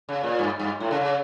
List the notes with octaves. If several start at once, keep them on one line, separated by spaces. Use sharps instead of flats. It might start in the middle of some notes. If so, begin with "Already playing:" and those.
C#3
A#2
G2
G2
A2
C#3
C#3